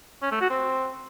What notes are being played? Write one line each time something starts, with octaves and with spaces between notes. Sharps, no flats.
C#4
A3
F#4
C4